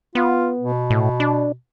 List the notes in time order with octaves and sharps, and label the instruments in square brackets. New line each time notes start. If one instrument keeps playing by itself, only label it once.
[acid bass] B3 [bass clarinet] F4
[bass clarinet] B2
[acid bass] A2
D4